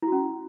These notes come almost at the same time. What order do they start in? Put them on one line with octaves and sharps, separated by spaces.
E4 F#4 C#4